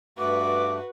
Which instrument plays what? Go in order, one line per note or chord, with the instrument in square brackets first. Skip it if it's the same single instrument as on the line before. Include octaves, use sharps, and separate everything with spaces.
[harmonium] G2 A3 [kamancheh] F#4 B4 [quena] D6